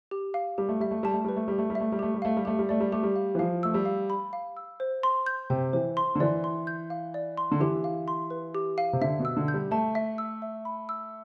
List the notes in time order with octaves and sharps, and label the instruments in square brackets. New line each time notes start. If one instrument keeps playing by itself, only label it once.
[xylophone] G4
F5
[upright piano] G3 [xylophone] G4
[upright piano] A3
[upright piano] G3 [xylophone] E5
[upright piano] A3
[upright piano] G3 [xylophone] A5
[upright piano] A3
[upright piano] G3 [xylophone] B4
[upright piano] A3
[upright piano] G3 [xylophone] G4
[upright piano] A3
G3
[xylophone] E5
[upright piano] A3
G3
[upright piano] A3 [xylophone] G4
[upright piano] G3
[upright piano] A3 [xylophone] F5
[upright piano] G3
[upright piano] A3 [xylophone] G4
[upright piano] G3
[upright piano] A3 [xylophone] D5
[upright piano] G3
[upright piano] A3 [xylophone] G4
[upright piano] G3
[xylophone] F5
[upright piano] E3
[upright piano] F3 [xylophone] F5
[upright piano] A3 [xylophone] E6
[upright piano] G3
[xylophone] F5
B5
F5
E6
C5
C6
G6
[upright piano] C3 [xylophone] G5
[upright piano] E3 [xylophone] C5
[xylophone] C6
[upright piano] D3
[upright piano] E3 [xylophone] D5
[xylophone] C6
G6
F5
D5
C6
[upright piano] D3
[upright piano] E3 [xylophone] G4
[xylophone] F5
C6
B4
G4
F5
[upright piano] C3
[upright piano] D3 [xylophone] E5
[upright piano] B2
[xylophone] E6
[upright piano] D3
[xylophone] G6
[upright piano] G3
[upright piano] A3 [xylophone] A5
[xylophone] E5
E6
E5
B5
E6